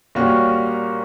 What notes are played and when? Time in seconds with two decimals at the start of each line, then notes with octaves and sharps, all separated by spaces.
0.15 A#2 G3 A#3 C#4 F#4